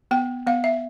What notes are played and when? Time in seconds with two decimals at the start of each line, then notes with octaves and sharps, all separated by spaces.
0.11 B3 G5
0.47 B3 F5
0.64 E5